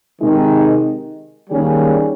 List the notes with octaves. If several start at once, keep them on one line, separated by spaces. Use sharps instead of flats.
C3 D#3 G#3 D#4
D#3 G3 A#3 C#4 G#4